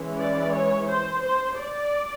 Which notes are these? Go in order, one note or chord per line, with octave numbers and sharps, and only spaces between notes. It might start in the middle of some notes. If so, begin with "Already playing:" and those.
Already playing: E3 G#3 C#4
D5
C#5
C5
C5
D5